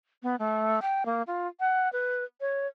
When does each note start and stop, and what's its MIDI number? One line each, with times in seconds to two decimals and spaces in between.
0.23 0.36 59
0.39 0.80 57
0.82 1.03 79
1.06 1.22 58
1.27 1.47 65
1.60 1.91 78
1.93 2.24 71
2.41 2.67 73